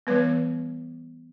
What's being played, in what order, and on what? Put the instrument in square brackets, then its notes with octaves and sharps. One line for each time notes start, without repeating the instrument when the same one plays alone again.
[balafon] E3 G3 B3 B4